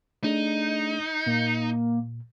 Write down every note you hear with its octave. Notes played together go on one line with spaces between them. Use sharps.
A3 D4 D#4 G#4
A#2 A#3